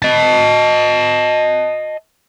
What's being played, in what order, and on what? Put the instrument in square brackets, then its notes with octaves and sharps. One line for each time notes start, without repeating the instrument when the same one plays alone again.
[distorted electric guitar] D#5 A5